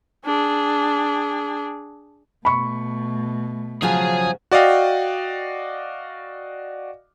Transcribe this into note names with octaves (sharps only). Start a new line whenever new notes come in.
D4 G#4
B2 A3 B5 C#6
C#3 F3 F#3 G#4 G#5
F#4 D5 D#5 F5 G5